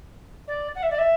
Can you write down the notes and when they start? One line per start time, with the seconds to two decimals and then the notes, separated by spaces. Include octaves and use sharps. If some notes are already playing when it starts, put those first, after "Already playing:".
0.47 D5
0.75 F#5
0.82 E5
0.90 D5
0.98 E5